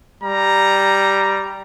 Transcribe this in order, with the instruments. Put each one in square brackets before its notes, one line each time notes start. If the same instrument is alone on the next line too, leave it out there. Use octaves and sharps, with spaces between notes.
[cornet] G3 [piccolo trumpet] A#5